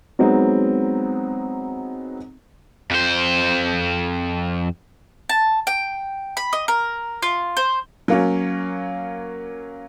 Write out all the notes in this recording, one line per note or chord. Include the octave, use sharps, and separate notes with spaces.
F#3 G#3 B3 C4 D#4
F2 C5
A5
G5
B5
D#5
A#4
F4
C5
F#3 A#3 C#4